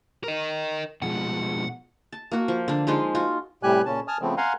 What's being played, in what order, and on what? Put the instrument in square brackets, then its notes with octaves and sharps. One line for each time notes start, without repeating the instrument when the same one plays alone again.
[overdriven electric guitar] A#4 D#5
[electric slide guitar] B2 F3 G#3 [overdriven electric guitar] F#5
[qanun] A5
A#3 F#4
F3
D3 D4
F3 G#3 D#4 F4
F4 F#4
[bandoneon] A2 C3 G3 G4 G#5 F#6
A#2 C#3 C#4 A5
G#5 A5 D#6 F6
C#3 F3 A3 B3 C4
F5 F#5 G#5 A#5 C6